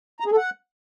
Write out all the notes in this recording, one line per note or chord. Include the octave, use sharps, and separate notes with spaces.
A#5
G#4
A4
F#5